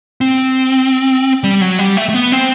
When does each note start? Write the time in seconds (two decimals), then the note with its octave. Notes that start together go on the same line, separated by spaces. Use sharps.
0.21 C4
1.44 G3
1.61 F#3
1.79 G3
1.97 A3
2.10 A3
2.14 B3
2.32 C4